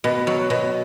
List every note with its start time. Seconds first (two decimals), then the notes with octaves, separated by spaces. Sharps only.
0.04 B2
0.27 F#3
0.50 B2